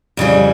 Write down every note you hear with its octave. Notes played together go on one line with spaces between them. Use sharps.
F2 C#3 E3 G3